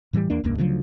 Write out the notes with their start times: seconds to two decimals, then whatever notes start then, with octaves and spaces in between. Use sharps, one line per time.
0.13 A2 E3 F3 G3
0.30 E2 A#3 D4
0.44 E1 C#2 G2 A#3
0.58 D2 C#3 F3 F#3